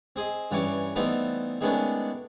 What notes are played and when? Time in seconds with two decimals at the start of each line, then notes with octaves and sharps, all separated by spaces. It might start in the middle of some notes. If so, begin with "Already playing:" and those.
0.16 C4 G#4 D#5
0.51 G2 E3 G3 C#4 C#6 D6
0.95 E3 G3 A3 B3 C4 D#4
1.61 D#3 G#3 A3 B3 C#4 D4